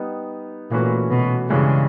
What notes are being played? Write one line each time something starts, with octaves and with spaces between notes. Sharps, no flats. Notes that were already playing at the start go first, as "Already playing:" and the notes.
Already playing: G3 B3 D#4
A#2 E3 A3 C#4 F#4 B4
B2
G2 C#3 E3 G#3